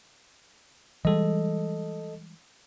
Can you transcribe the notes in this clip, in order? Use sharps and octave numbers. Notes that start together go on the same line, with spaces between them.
E3 G3 G#3 A4 D#5